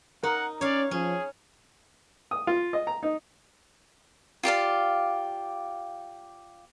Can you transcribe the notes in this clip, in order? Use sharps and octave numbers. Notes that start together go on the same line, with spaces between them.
D#4 A#4 F#5
C#4 C#5 D5 F5
F3 C#4 G#4
D#6
F4
D#5
A#5
D#4
F4 G4 D5 F5